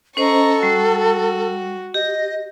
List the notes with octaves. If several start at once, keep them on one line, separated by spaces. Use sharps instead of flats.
C#4 A4 C5 D#5 A#5 C#6
G3 F#4
G4 D#5